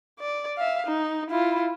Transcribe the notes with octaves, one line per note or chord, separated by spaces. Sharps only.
D5
E5 F5
D#4
E4 F4